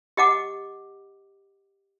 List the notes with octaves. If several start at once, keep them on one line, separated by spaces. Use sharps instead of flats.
G4 D#5 F#5 D6